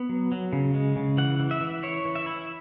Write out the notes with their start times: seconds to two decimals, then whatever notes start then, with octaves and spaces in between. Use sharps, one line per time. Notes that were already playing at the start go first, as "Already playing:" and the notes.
Already playing: B3
0.09 F#3
0.32 F#3
0.53 C#3
0.74 G#3
0.96 C#3
1.17 E3 F#5
1.40 E3
1.51 E5
1.61 E3
1.83 E4 C#5
2.05 E3
2.15 E5
2.26 E4